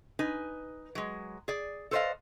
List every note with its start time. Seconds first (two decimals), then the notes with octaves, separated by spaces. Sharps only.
0.19 D#4 B4 G#5
0.95 F#3 G#3
1.48 G#4 D5
1.91 A4 B4 C5 D5 D#5 F5